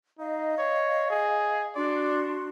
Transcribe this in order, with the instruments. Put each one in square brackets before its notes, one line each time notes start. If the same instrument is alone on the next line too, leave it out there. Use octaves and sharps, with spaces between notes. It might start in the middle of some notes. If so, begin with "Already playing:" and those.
[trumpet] D#4 [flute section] D#5 F5
[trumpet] C#5
G#4
[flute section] D4 F#4 C6 [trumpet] D5